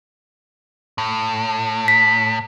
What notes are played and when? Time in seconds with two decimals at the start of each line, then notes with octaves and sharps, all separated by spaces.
0.98 A2
1.88 B6